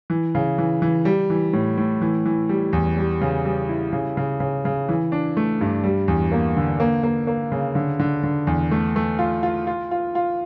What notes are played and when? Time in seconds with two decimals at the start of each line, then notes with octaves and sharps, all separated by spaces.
0.10 E3
0.35 C#3
0.58 E3
0.82 E3
1.05 G3
1.30 E3
1.53 A2
1.77 A2
2.01 E3
2.26 E3
2.49 G3
2.73 E2
2.97 G3
3.21 C#3
3.45 G3
3.69 E4
3.93 C#3
4.17 C#3
4.40 C#3
4.65 C#3
4.89 E3
5.12 D4
5.37 A3
5.61 G2
5.84 G3
6.08 E2
6.32 A#3
6.57 D3
6.80 A#3
7.03 A#3
7.27 A#3
7.52 C#3
7.75 D3
7.99 D3
8.23 D3
8.47 E2
8.71 A3
8.96 A3
9.19 F4
9.43 F4
9.67 F4
9.91 F4
10.15 F4